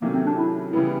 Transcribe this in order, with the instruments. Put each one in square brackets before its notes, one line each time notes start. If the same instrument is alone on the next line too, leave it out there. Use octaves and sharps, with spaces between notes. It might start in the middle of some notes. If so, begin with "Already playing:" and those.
[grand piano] C3 D#3 F#3 A3 C#4 [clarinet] A#3
[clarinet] C4
D4
E4
[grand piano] C#3 E3 G3 B3 [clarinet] E4